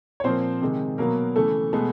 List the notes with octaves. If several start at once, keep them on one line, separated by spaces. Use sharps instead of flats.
C#5
A#2 F3 A#3 C4 C5
C3 D#3 G#3
B2 F#3 A#3 B3 A#4
C#3 E3 A3 A4
B2 G#3 A3 B3 A4